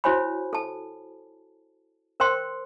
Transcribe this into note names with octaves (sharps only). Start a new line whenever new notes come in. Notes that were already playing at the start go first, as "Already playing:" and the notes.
E4 F#4 C5 C#5 G#5 B5
A4 A5
A#4 C5 G5 C6